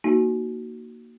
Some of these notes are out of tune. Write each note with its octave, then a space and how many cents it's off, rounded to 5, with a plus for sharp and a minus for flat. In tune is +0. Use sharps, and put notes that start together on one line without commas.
A#3 +0 D#4 +0 F#4 +5